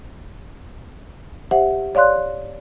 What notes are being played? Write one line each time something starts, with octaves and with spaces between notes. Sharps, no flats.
G4 C5 E5 F#5
C#5 D5 F5 C6 F#6